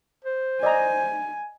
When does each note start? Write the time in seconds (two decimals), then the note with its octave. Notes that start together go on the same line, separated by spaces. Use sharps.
0.25 C5
0.63 D5 D#5 G#5 A#5